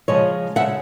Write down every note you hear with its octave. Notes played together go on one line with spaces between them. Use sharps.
C#3 F3 G#3 C#5 D#5
C#3 F3 G#3 E5 F#5